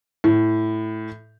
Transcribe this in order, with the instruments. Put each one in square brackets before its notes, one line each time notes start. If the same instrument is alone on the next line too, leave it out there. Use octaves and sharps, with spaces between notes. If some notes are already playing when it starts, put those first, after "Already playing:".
[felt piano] A2